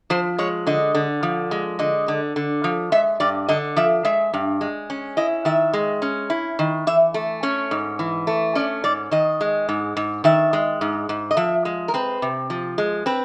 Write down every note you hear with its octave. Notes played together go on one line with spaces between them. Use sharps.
F3 C5
G#3 C#5
D3 D#5
D3
F3
G#3
D3 D#5
D3
D3
F3
G#3 E5
G2 D5
D3 D#5
F3 E5
G#3 E5
G2
G#3
C#4
E4 D#5
D#3 E5
G#3
C#4
E4
D#3
E3 E5
A3
C#4 C#5
G#2
E3
A3
C#4 D5
G#2 D5
D#3 D#5
G#3
G#2
G#2
D#3 E5
G#3
G#2
G#2
D#5
F3 E5
G#3
A#4
C4 B4
C3
F3
G#3
C4 B4